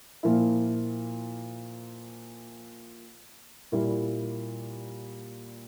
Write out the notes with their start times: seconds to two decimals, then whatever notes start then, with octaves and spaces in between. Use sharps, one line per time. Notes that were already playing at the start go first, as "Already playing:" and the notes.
0.23 A#2 F3 A#3 E4
3.72 A#2 G3 A#3 E4